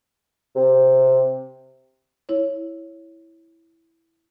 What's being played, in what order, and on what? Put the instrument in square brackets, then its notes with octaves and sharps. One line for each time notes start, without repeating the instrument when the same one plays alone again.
[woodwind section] C3
[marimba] E4 C#5